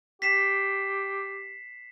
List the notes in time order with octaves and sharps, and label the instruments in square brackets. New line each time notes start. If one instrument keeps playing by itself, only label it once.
[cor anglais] G4 [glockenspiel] B6 C7 E7